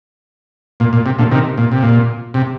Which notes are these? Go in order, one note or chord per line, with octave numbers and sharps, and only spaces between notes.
A#2
A#2
C3
A#2 D3
C3 D#3
A#2
C3
A#2
C3